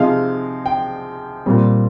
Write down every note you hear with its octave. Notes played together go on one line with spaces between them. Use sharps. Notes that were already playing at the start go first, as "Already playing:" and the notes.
Already playing: C3 F3 G#3 D#4 F5
G5
A#2 G3 C4